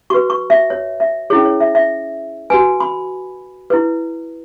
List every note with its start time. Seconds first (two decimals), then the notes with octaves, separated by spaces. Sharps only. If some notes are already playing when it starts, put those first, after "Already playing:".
0.10 F#4 B4 C#6
0.30 C#6
0.50 E5
0.70 C#5
1.00 E5
1.30 C#4 E4 G#4 C#5
1.45 C#5
1.60 E5
1.75 E5
2.50 F#4 B4 G#5
2.80 B5
3.70 E4 B4